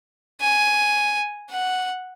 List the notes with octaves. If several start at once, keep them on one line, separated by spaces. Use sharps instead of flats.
G#5
F#5